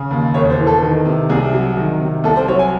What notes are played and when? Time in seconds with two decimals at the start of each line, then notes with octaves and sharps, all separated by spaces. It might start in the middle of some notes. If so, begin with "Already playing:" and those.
Already playing: C#3
0.11 D#2
0.34 E1 C#5
0.50 C5
0.59 E3
0.67 A4
0.82 D#3
1.05 C3
1.30 C2 G#4
1.53 F#3
1.77 D#3
2.00 C3
2.24 C2 A4
2.36 C5
2.48 F#3 C#5
2.59 G#5